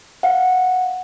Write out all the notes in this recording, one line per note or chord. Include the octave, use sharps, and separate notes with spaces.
F5 F#5